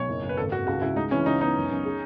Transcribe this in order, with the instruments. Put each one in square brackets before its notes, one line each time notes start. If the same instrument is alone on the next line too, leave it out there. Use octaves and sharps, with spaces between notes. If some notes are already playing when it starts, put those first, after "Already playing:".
Already playing: [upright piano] B1 [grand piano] C#5
[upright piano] F#1
F#1
[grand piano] B4
[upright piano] G#1 [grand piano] A4
[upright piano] G#1 [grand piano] F#4
[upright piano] C#2 [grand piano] F#4
[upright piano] C#2 [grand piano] E4
[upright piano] G#3 [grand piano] D#4
[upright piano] E3 [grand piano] C#4
[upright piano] C#2 [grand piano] D#4
[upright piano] B3 [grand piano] D#4
[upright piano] F#2
F#2
G#4